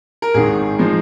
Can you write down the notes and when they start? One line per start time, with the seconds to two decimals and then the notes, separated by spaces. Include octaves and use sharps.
0.22 A#4
0.34 G#1 G#2 D#3 G#4
0.79 F3 G#3 D#4